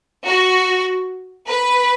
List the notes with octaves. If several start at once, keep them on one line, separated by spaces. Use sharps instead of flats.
F#4
B4